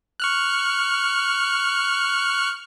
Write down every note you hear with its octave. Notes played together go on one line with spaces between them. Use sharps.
C#6 F6 F#6